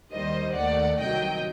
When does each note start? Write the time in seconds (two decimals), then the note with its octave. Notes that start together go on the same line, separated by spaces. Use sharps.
0.11 D#2 D#3 G3 C5 D#5
0.55 D#2 D#3 A3 D5 F#5
0.99 C2 C3 D#3 F#3 D#5 G5